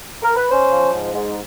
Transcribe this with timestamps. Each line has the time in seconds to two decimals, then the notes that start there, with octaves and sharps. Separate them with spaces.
0.23 A#4
0.36 B4
0.50 C#4 C5
0.71 F3
0.92 G#2
1.13 G#2